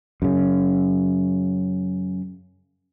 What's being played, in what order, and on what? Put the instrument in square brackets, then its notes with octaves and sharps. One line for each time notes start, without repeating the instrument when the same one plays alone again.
[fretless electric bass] F#2 C#3